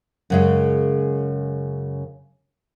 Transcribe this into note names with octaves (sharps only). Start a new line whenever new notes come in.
F#2 C#3 G#3